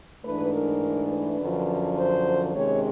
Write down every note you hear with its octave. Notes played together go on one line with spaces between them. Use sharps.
G#2 E3 A3 D4 B4
A#4
B4
F#2 D3 F3
C5
C3 D#3 G#3 C#4 C#5